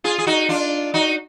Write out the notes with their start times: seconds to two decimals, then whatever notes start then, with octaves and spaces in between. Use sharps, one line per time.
0.04 F4 G#4
0.18 G#4
0.27 D#4 F#4
0.49 D4 F4
0.94 D#4 F#4